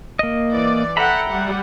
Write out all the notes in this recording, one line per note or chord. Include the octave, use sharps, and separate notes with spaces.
A#3 D#5
E3 D5
A4 E5 F#5 G5 A#5 B5
G3 F#5